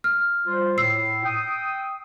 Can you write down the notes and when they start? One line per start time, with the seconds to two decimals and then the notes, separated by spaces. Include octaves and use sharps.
0.04 F6
0.46 G3 F4 C5
0.78 A2 E6 C7
1.24 G5 D#6